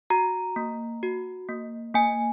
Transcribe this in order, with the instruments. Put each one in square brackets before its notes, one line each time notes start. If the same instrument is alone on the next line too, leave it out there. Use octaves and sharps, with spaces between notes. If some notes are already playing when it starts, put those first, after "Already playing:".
[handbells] F#4 A#5
A#3
F#4
A#3
A#3 G#5